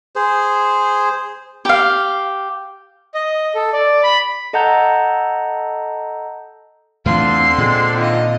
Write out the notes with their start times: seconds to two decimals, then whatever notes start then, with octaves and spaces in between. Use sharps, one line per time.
0.16 G#4 C5
1.65 G4 F5
3.14 D#5
3.55 A4
3.73 D5
4.04 B5
4.53 A4 D#5 F#5 A5 A#5 G6
7.06 E2 D3 E3 A3 C4 F4 C6
7.58 A#2 G#3
7.97 D#3 F4 D#5